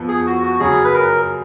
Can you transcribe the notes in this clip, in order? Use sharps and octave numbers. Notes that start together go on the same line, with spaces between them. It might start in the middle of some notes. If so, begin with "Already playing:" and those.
Already playing: F2 F3 B3
G#4
F#4
F#4
F#2 C#3 F#3 G#4
B4
A#4